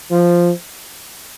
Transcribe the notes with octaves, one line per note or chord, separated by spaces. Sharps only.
F3